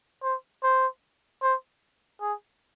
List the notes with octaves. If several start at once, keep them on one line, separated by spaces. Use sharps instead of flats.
C5
C5
C5
G#4